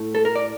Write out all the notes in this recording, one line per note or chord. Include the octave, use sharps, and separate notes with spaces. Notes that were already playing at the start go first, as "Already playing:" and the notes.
Already playing: A2 A3
A4
A#4
D5